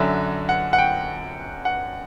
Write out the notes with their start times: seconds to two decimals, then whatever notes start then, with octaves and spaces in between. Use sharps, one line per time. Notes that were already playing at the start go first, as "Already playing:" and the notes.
Already playing: F#2 D3 F#3 E5
0.49 F#5
0.73 F#5
0.78 G5
1.65 F#5